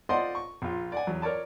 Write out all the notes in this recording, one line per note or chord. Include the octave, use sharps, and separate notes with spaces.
F4 C5 D5 D#5 F#5 C6
C#6
A#1 F4
D5 F#5 G#5
E2 F#3
A#4 C#5 D5 A5